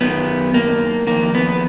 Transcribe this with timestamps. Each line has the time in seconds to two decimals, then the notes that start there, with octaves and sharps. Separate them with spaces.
0.01 F#2 D#3 B3
0.54 A#3
1.07 F2 D#3 A#3
1.35 B3